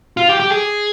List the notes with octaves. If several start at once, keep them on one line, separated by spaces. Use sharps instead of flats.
F4
G4
G4
G#4